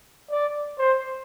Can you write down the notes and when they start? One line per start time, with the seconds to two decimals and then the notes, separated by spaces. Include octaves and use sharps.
0.31 D5
0.78 C5